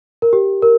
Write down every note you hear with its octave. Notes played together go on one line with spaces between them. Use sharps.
A#4
G4
A#4